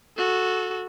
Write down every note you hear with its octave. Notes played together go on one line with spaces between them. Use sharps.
F#4 A4